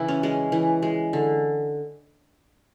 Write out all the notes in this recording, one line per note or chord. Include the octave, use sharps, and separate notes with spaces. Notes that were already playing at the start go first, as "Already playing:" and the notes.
Already playing: C#3 E3 E4
C#4
G#3 C#4
E3
G#3
D3